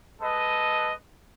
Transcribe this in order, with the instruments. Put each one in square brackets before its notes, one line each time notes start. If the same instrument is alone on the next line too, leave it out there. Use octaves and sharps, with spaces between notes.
[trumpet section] G#3 A4 B4 D#5